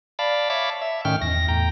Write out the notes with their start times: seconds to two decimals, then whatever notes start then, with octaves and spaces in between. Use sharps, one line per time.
0.19 D5 F5 A5 B5
0.50 C#5 E5 F5 A5 B5 D6
0.82 E5
1.05 A2 D#3 C#4 G5 F6
1.22 E2 A#6
1.48 E2 A2 G5 A#5